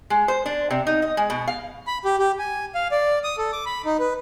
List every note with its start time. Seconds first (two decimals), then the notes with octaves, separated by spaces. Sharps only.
0.10 G#3
0.28 C5
0.46 D4
0.71 C3
0.87 D#4
1.02 D#5
1.17 G#3
1.30 B2
1.48 F5
1.87 B5
2.05 G4
2.19 G4
2.39 G#5
2.75 F5
2.91 D5
3.24 D#6
3.38 A4
3.53 D6
3.66 B5
3.85 D#4
3.99 B4